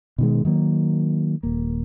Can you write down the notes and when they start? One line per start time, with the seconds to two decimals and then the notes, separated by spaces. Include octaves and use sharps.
0.18 B2 D#3 G#3
0.45 D#3 F#3 A#3
1.43 D#1 A#3